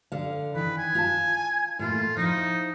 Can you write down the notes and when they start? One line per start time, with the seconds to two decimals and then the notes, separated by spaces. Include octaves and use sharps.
0.12 D3 F5
0.55 D#3 E3 B4
0.78 G#5
0.95 F4 A5
1.79 A2 E3 A#3 F4
2.17 F3 D#4 E4